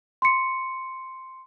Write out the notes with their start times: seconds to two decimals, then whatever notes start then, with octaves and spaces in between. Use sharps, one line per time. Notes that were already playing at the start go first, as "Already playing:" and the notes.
0.22 C6 C#7